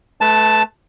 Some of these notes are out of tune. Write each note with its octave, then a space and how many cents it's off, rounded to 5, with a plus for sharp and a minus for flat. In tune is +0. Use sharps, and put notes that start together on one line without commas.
A3 -25 B4 +0 A5 +0